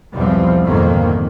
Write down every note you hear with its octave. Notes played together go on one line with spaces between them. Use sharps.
B1 E2 B2 F3 G3 C4
F2 G#2 D3 D#3 F3 A#3